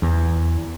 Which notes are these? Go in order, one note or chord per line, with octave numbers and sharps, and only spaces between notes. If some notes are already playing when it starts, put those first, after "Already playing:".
E2